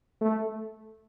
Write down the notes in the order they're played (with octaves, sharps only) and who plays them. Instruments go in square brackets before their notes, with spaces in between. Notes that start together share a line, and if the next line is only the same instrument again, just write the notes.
[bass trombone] A3